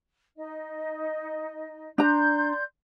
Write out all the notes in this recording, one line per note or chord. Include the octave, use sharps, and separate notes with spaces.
D#4 D#5
D4 D5 A#5 C6 G6